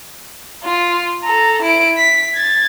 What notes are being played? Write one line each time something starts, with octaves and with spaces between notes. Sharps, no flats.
F4
A4 A#5
E4 D7
B6
G#6 A6